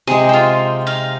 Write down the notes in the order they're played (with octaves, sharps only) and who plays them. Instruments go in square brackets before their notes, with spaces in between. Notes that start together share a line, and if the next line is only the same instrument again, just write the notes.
[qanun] C3 G#3 [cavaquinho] G#4
[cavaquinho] F4 G5 [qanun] C5
[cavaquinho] D#4 F5